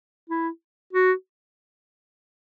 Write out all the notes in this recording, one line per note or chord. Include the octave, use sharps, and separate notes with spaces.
E4
F#4